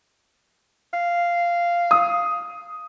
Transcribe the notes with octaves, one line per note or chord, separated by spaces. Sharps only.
F5
D#6